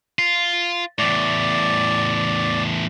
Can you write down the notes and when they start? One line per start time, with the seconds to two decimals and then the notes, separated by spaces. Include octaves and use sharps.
0.19 F4
0.99 E2 A2 D5